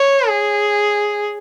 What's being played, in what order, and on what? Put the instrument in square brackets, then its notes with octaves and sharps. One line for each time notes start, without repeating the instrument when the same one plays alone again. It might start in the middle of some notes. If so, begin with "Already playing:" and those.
Already playing: [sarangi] C#5
G#4